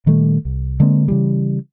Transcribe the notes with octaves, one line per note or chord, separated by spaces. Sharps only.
A#2 D#3 G3 A3
C2
D3 G#3 A#3 C4
C#3 E3 G3